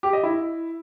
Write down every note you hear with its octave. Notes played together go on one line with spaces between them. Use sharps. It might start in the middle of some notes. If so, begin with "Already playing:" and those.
G4
D#5
E4